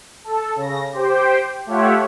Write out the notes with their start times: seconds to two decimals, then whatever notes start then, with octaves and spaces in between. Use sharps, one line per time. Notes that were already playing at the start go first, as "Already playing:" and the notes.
0.24 A4
0.56 C#3 A#6
0.92 G4 C5 G5
1.66 A3 F4 G4 C#5 E5 F#5